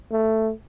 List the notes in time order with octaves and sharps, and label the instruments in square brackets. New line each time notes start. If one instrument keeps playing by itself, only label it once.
[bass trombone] A3